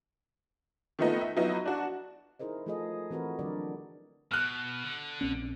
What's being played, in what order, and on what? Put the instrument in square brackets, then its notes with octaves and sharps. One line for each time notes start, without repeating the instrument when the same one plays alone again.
[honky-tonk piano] D#3 F3 A3 B3 D#4
E5
F3 F#3 B3 D#4 E4
D4 F#4
[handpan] D#4 E4 G#4 A#4 C5 D#5
F3 A3 F4 G#4 A4 D#5
E3 C4 F#4 A#4 B4
D3 F#3 D4 A#4 D5
[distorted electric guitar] B2 [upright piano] F6 F#6
[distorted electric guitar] D3
[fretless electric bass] A#1 C4 C#4